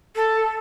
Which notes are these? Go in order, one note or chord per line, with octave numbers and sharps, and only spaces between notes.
A4